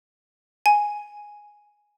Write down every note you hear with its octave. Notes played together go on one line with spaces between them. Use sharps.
G#5